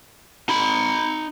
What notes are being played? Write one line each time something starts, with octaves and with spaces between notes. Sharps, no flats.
D#4 B5